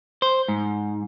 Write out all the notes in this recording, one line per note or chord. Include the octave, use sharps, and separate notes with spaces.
C5
G#2